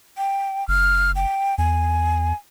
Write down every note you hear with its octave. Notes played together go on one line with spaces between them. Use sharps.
G5
F#1 F6
G5
E2 G#5